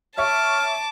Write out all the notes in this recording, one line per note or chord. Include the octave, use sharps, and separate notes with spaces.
C#5 E5 A5 C#6 D6 F6